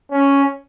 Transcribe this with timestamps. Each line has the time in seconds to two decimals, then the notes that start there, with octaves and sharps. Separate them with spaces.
0.11 C#4